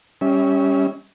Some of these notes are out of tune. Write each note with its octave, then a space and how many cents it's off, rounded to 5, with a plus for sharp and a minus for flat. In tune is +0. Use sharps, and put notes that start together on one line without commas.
G3 +10 C#4 +5 E5 -35